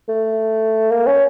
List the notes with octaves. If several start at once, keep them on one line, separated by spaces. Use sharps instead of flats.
A3
A#3
C#4